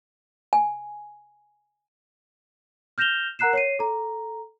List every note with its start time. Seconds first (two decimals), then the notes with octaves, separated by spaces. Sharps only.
0.53 G#5
2.98 F6 G6 A#6 E7 F7 G7
3.39 A#4 F#5 A#5 F#6 C7 E7
3.53 C#5 C7 D#7
3.79 A4 A#5